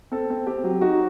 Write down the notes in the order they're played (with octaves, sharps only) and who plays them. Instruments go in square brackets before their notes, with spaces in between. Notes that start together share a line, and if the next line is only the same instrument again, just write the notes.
[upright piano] C4 A4
C4
C4 G4
F#3
D#4 F#4